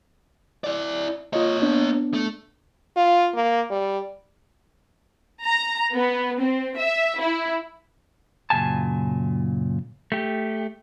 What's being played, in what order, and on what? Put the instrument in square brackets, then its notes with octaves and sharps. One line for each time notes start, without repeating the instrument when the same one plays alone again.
[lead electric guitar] E4 D5
[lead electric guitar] A#3 C#5 [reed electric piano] F4 D#5
[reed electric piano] B3 D4
[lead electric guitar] A3
[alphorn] F4
A#3
G3
[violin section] A#5
B3
C4
E5
E4
[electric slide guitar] F#2 A#2 C#3 G#5 A5
A3 G4